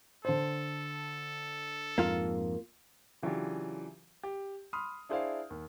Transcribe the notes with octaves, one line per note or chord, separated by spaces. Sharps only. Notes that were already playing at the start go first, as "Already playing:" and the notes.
D3 A4 C5
F2 G#2 A#3 F4 F5
C#3 E3 F#3 D4 F4 G4
G4
B5 C6 D#6 F6
D4 E4 G#4 C5 D5 F5
D#2